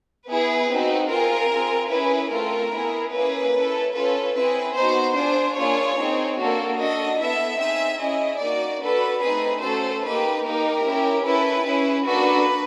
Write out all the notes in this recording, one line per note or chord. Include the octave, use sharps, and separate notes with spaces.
B3 E4 G#4 B4
C4 D#4 F#4
C4 F4 G#4 A#4
C4 F4 G#4
C#4 E4 G#4 B4
A3 C4 F4 A4 A#4
B3 E4 G#4
A#3 C#4 E4 G#4 B4
C#4 E4 A4
C#4 F4 A4 B4
C4 E4 G#4 B4
B3 D#4 F#4 C5
D4 F4 G#4 C5
A#3 D4 F4 G#4 C#5
C4 D#4 G#4
A#3 D4 F#4 A4
D4 F#4 A4 D#5
B3 E4 A4 E5
C4 D#4 G#4 E5
C#4 E4 G#4 D#5
A#3 D#4 F#4 D5
D4 F#4 A4 B4
A3 C4 D#4 G#4 B4
A3 C#4 F#4 A4 C5
A#3 D#4 G4 B4
A#3 D#4 G4 A#4
C#4 E4 G4
C#4 E4 A4 B4
C#4 E4 G#4
A#3 D4 F#4 A4 B4